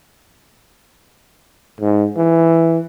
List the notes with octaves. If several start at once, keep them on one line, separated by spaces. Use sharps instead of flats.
G#2
E3